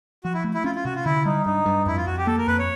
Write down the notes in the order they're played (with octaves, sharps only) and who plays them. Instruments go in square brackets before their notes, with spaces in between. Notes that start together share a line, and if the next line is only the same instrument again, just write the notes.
[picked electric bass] F3 [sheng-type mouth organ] F#4
[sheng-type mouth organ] E4
[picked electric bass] A3
[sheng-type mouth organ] E4
[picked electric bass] C#4 [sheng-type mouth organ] F4
[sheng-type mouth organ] F4
[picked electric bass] C3 [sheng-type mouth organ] F#4
[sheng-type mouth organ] F4
[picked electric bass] D3 [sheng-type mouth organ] E4
[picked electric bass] G3 [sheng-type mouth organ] D#4
[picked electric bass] G2 [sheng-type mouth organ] D#4
[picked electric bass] G2
[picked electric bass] F2 [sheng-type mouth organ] E4
[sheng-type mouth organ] F4
[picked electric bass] F2 [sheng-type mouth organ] F#4
[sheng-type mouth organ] G4
[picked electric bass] A#3 [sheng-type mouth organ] A4
[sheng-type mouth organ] A#4
[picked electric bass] F2 [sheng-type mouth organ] B4
[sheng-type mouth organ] C#5